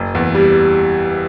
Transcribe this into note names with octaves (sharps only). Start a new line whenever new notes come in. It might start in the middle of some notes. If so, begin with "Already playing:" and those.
Already playing: F#1
E2
G3